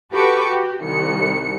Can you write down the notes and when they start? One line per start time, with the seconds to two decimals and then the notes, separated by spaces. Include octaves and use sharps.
0.12 F#4 G4 A4 B4 C#6 D6
0.47 F#4 G4
0.84 C2 D#3 C#7